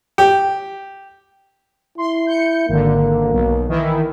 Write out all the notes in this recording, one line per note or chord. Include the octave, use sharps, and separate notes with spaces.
G4
E4 C6
G6 C#7
G#1 D3 A#3
B1
D#3 E3 E4